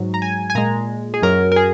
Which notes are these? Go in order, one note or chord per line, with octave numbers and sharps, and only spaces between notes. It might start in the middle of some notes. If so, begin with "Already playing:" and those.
Already playing: G#2 F#3
A#5
G#5
G#5
A#2 G#3 A#5
G#4
F#2 F#3 A#4
A#4
G#4